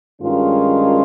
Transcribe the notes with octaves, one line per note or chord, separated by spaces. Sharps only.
G2 D#3 G#3 C#4 F4